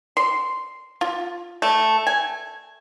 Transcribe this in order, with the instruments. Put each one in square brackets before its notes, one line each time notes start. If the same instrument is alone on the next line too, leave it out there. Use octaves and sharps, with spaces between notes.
[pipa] C6
F4
A3
G#5